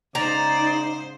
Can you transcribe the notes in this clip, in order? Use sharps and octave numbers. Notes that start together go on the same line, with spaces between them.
G#2 C#3 D#4 C5 D5 A#5